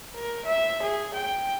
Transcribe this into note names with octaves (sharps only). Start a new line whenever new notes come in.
A#4
E5
G#4
G5